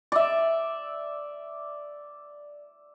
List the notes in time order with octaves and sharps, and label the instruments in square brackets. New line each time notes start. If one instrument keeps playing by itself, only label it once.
[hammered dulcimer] D5 E5